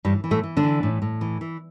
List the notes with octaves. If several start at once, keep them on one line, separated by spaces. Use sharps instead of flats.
G2 E3 G3
E3
A2 A3
E3
D3 D4
E3
A2
A2
E3
E3